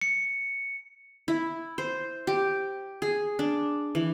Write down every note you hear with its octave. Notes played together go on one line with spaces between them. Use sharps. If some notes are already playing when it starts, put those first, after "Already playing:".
C#7
E4
C5
G4
G#4
D4
E3